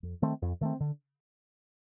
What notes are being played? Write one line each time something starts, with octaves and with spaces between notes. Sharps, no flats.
F2
D#3 A3 C4
F2
D#3 A3 C4
D3